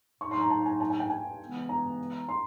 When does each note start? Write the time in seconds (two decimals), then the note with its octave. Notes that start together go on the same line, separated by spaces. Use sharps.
0.21 A2 F#3 A#3 D#4 C#6
0.31 C6
0.41 A#5
0.50 A5
0.66 G#5
0.80 A5
0.90 G#5
1.00 G5
1.10 G#5
1.39 C#3 E3 G#3 B3
1.69 A#5
2.29 C6